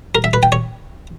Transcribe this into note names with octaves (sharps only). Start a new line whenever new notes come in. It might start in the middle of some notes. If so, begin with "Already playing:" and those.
A#4
E5
B4
G5
C#5